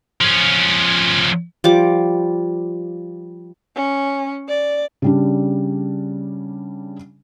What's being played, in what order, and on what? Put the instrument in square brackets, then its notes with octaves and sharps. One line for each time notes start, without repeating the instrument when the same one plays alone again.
[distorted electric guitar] F3 C#4
[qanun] F3 G3 D6
[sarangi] C#4
D5
[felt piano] C#3 G3 D4